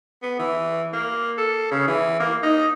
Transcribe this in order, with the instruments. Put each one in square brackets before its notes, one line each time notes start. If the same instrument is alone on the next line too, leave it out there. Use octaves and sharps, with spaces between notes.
[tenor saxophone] B3
E3
A#3
A4
C#3
E3
A#3
D#4